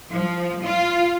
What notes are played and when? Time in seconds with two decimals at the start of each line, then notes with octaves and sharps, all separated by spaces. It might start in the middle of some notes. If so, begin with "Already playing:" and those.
0.12 F3
0.63 F4